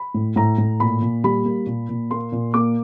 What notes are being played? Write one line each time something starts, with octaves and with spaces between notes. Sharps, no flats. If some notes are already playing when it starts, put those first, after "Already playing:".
Already playing: B5
A2
A2 A#5
A2
A#2 B5
A#2
G3 B5
A#3
A#2
A#2
A#3 C6
A#2
A#3 D6